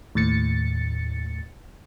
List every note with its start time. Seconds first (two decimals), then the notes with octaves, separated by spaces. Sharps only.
0.15 D#2 A2 A6 C#7